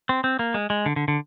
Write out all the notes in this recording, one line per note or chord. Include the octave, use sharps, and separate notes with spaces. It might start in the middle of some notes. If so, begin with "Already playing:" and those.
C4
C4
A#3
G#3
G#3
D3
D3
D3